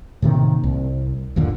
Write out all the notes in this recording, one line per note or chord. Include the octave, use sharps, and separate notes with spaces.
A2 C3 D#3 A#3
C2
G1 D#2 A#2 D3